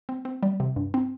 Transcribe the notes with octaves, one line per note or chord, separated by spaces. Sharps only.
C4
C4
G3
C3
G2
C4